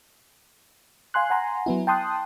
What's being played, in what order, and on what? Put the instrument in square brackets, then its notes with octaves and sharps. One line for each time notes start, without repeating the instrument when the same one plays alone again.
[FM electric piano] F5 G#5 C6 F#6
F#5 G#5 A#5 C6
F#3 B3 E4
G5 A5 C6 D#6 F#6